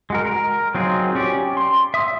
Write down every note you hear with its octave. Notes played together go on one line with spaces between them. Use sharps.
G#3 F#4 A#4
A#4
F#3 C4 D#4 F4 G#4
C#4 G4 D5
C6
E5 D#6